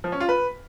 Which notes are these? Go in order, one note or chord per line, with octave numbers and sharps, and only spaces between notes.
F3
C#4
F4
B4